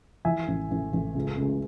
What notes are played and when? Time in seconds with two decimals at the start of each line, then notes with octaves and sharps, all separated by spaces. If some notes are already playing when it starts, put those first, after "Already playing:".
0.25 E3 E5 G#5
0.48 A1
0.71 A1
0.93 A1
1.15 C#2
1.38 C#2